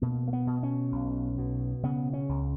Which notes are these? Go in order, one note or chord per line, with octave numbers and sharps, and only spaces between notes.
B2 A#3
A#3
B3
B2
C#4
B1
B2
C#3 B3
C#4
C#2